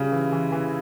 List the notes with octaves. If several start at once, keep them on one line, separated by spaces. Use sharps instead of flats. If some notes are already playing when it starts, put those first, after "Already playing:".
Already playing: C#3 G3 F4
E3
E3
E3